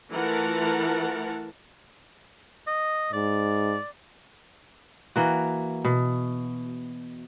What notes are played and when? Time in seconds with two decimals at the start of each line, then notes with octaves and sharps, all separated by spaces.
0.11 E3 A3 F4 A#4 F#5 A5
2.67 D#5
3.13 G#2 D5
5.16 E3 A#3 F#4
5.85 B2